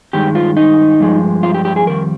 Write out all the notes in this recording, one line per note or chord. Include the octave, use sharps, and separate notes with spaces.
G2 D#3 G#3 G4
F4
D#4
G2 F3 G#3
F4
G4
G4
G#4
F2 D#3 G3 A#4